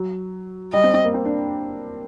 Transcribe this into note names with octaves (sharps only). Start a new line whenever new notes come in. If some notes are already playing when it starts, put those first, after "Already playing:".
Already playing: F#3
G3 D#5
C4
C4
A#3
C4
D4